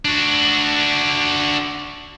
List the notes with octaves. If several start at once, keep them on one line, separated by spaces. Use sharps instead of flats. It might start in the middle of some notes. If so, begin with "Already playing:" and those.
D4 F#4